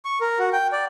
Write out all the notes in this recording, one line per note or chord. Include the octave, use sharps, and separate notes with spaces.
C#6
A#4
F#4
G5
D5